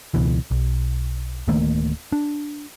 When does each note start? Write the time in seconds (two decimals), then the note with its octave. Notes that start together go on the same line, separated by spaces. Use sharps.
0.14 C#2 B2 E3
0.51 B1
1.48 D1 D#3 A3 A#3
2.12 D4